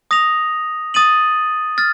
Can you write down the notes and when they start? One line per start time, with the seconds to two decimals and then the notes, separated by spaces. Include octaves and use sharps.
0.11 D#6 A#6 F7
0.94 D#6 A6 D#7 F#7
1.78 F6 A6